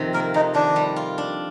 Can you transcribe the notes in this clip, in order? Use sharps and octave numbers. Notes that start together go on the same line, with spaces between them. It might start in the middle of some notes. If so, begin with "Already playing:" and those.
Already playing: F2 C3 D#3
A#3 A#4
F2 D#4
D#3 D4
G3
F4
D4